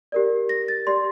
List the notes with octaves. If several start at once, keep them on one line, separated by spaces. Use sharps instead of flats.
G4 A#4 D5
A#6
A6
G4 D5 C6